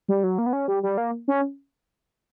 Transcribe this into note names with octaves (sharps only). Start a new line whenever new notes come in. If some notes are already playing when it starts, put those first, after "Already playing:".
G3
F#3
A#3
B3
C#4
G3
G3
A#3
C#4